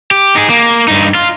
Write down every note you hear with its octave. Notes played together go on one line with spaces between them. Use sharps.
G4
D#4 G#4
A#3
G2 D#4
F4